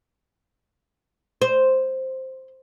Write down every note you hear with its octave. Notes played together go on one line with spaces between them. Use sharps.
C5